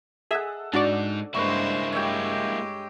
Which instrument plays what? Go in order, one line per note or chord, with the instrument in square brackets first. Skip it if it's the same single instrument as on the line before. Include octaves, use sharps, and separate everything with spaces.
[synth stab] G#4 E5 [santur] A4 D#5 F#5
[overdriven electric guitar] G#2 D#4 [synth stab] D4 F#4 D5
[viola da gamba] G2 G#3 C5 [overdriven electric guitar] A#3 E4 [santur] B4 C6 C#6
[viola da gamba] G#3 G4 [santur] C#5 E5 G5